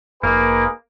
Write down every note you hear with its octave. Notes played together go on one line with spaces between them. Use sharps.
F1 A#3 D#4 G#4 B4